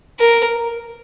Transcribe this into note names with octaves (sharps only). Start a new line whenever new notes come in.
A#4